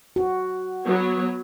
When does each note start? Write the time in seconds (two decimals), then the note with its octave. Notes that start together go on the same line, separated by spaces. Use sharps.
0.16 F#4
0.86 F#3 B3 C#5